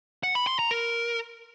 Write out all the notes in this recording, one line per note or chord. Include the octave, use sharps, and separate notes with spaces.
F#5
B5
C6
A#5
A#4